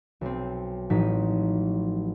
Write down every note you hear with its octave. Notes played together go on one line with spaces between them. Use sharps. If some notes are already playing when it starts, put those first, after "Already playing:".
B1 C4
A1 A2 F3 F#3 D#4 B6